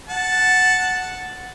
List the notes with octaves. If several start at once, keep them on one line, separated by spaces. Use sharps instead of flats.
F#5 A5